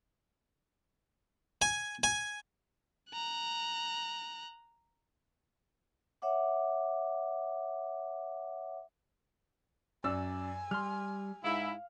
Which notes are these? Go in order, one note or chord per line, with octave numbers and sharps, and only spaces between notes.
G#5
G#5
A#5 F#6
C#5 E5 F#5 D6
F#2 D5 G#5 E6
G3 C6 F6
G#2 E4 F5